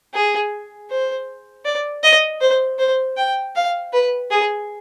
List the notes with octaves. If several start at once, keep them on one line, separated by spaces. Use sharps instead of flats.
G#4
C5
D5
D#5
C5
C5
G5
F5
B4
G#4